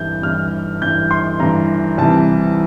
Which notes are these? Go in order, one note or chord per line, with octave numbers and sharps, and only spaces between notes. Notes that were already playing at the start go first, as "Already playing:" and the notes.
Already playing: G2 E3 G6
G2 E3 F6
G2 E3 G6
C6
G2 E3 A#5
C2 C3 E3 A5